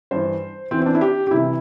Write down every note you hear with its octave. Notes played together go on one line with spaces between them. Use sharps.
G2 E3 C5
E2 E3 C4
C4
D4
E4
G4
G4
C2 C3 E3 E4